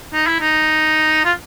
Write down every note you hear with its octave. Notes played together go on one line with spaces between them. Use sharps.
D#4
E4
D#4
F4